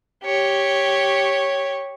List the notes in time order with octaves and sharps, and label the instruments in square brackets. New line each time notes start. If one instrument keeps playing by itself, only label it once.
[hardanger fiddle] G4 C#5